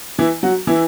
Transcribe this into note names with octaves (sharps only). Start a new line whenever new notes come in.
E3 E4
F#3 F#4
E3 E4